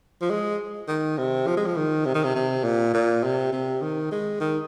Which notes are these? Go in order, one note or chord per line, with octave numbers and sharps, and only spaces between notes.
F3
G#3
D#3
C3
F3
G#3
F3
D#3
C3
D#3
C3
C3
A#2
A#2
C3
C3
D#3
G#3
D#3